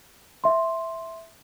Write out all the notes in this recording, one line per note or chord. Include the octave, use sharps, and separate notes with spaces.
E5 C6